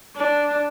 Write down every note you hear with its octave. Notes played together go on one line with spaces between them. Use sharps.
D4